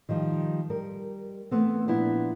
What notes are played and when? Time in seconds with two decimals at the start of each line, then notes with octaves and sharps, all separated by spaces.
0.09 D#3 F3 G3
0.70 G3 A#4
1.51 E3 A3 B3 C4
1.87 A#2 F3 B3 D4 E4